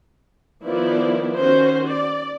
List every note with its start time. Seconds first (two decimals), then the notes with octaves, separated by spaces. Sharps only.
0.65 D#3 F3 B3 E4 B4 D5
1.35 D#3 C#4 F#4 C5
1.88 D5